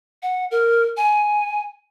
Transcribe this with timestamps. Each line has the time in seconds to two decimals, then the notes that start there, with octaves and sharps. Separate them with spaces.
0.23 F#5
0.51 A#4
0.97 G#5